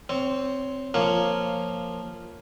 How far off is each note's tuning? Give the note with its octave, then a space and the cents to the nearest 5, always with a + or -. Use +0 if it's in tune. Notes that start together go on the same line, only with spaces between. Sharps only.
C4 +0 C#5 +20
F3 +0 A#3 -10 C#5 +0